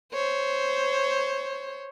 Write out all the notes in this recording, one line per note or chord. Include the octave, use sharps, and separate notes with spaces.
C5 C#5